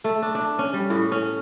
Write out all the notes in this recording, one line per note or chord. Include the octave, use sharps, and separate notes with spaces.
A3
D4
D4
C#4
G3
A2
C#4